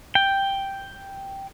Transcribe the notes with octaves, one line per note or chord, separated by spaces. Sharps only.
G5